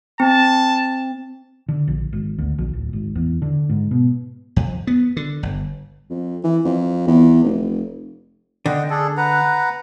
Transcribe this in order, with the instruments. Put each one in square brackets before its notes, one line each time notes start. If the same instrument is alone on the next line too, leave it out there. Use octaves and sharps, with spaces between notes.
[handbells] C4 [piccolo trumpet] A5
[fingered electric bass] D3
A#1
G#1
D2
A#1
D1
G#1
E2
D3
G#2
B2
[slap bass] F2
B3
D3
G1
[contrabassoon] F2
E3
F2
E2
F1
[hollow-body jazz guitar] D3 [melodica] D#5 F#5 G5
[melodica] D4 G#4 A4
B4 F#5 A#5